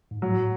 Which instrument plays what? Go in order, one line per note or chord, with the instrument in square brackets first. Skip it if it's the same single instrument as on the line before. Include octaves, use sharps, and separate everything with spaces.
[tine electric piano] G#2
[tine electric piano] A2 [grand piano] F#3